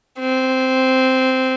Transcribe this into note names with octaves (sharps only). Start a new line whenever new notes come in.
C4